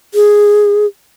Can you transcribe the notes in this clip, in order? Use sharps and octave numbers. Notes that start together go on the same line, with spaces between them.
G#4